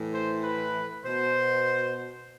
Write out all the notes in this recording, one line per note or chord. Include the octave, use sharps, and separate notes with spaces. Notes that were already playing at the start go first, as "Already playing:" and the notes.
Already playing: A2 E3
C5
B4
B2 C5